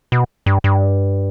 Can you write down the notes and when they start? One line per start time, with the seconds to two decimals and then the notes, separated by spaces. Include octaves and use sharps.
0.12 B2
0.46 G2
0.64 G2